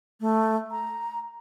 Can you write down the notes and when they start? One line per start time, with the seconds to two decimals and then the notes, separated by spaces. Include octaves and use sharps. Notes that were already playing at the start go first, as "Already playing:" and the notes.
0.21 A3
0.71 A#5